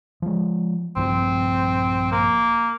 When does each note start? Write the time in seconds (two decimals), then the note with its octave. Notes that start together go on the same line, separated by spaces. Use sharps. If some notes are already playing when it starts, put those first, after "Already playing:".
0.22 F3 G#3
0.96 A#1 G2 F3 C4
2.12 A#3